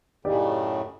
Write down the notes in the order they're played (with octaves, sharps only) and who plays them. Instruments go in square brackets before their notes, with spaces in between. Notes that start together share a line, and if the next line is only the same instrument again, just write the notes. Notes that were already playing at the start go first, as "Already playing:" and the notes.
[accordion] F#2 A2 C#3 [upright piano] D#4 G4 D5